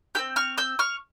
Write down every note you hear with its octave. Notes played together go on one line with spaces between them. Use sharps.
C4 G4 E6 G6
C#6 F6
E6 G6
C#6 F6